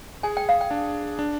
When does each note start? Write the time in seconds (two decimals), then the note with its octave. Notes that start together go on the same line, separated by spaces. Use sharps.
0.23 G#4 G#5
0.37 G5
0.49 F5
0.61 G5
0.71 D4
1.19 D4